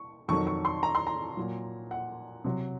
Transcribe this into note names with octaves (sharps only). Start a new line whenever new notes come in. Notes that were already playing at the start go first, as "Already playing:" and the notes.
Already playing: C#6
F2 D#3 F#3 C#6
C#6
C6
A#5
C6
A#5
A#2 F#3
F#5
C3 F#3